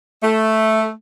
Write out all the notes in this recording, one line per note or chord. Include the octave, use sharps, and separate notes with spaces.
A3